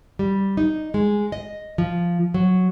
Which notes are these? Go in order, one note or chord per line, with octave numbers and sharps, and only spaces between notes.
G3
D#4
G#3
D#5
F3
F#3